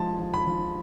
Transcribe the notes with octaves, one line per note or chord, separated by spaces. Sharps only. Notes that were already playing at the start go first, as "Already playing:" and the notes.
Already playing: F3 G#3 A5
F3
B5
F3